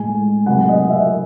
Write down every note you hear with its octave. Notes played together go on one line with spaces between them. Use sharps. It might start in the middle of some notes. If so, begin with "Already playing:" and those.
Already playing: A2 G#3 G#5
C3 F#3 A3 F#5
D#5
E5